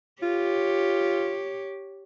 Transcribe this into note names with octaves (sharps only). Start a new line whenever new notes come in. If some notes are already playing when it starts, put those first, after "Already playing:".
F4 G4 C#5